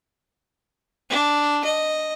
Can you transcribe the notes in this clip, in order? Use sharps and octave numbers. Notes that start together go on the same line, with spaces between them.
D4
D#5